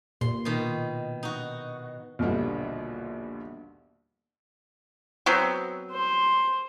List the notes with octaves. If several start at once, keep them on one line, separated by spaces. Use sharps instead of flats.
A#2 C6
B2 D#3
D#4 F#4
A#1 D#2 B2 D3 G3
F#3 B3 C4
C5